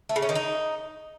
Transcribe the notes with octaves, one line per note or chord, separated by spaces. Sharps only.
A3
C#3
C#4
D#3
D#4